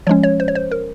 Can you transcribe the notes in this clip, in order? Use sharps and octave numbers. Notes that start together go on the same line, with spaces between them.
F3 G#3 C#4 C#5
C#5
C5
C#5
C5
A#4